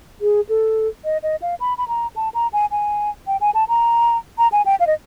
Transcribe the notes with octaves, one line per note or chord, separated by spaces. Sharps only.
G#4
A4
D#5
D#5
F5
B5
B5
A#5
A5
A#5
G#5
G#5
G5
G#5
A5
A#5
A#5
G#5
G5
F5
D#5